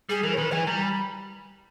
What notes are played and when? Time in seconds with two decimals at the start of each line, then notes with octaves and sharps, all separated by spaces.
0.09 G3 G#4
0.24 E3 A#4
0.34 C#5
0.38 D#3 B4
0.52 E3 G#5
0.67 G3 A#5
0.82 B5